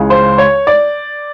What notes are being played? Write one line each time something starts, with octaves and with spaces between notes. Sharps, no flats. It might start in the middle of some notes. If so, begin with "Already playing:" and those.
Already playing: C#2 C#3 E3 G#3
C5
C#5
D5